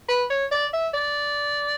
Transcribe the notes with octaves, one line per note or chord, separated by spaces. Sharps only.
B4
C#5
D5
E5
D5